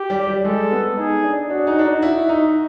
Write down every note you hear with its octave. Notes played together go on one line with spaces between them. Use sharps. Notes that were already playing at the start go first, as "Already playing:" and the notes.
Already playing: G4
G3
G3
G#3 A4
B3
D#4 G#4
D4
D4 F#4
D#4
D4
D#4
E4
D#4